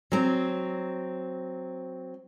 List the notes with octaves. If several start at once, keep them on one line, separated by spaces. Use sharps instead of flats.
F#3 C4